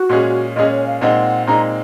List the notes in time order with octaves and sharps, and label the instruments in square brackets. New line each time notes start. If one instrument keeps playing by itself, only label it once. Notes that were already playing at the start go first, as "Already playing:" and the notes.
Already playing: [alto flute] F#4
[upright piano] A#2 G#3 C#4 G#4
[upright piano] A#2 G#3 C#4 G#4 [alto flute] D#5
[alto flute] C#5
F5
[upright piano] A#2 G#3 C4 D#4 [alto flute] F#5
[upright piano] A#2 G#3 C4 D#4 [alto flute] A#5